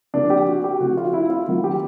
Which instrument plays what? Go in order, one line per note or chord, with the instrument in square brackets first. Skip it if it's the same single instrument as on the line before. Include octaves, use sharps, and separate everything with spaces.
[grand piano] C3 F3 A#3 D4
G4
F#4
G4
C3 F3 A3 F#4
F4
E4
F4
D#3 F#3 A#3
G4